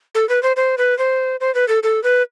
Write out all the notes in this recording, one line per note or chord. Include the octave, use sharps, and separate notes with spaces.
A4
B4
C5
C5
B4
C5
C5
B4
A4
A4
B4